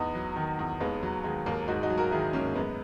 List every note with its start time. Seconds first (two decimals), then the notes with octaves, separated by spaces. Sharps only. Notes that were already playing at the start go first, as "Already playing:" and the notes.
Already playing: E2 B3 D#4
0.15 F#3
0.36 D#3
0.59 E2
0.80 D#2 G#3 B3
1.03 F#3
1.24 D#3 G#3
1.46 D#2 A#3
1.68 G#2 D#4 F#4
1.83 D#4 F#4
1.90 F#3
1.97 F#4 A#4
2.11 D#3 E4 G#4
2.33 G#2 A#3 C#4
2.55 F#2 G#3 B3